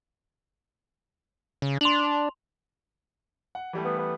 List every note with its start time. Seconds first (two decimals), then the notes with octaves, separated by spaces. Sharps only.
1.62 C#3
1.81 D4 C6 F7 F#7
3.55 F#5
3.73 E3 G3 A3
3.85 B3
3.99 B3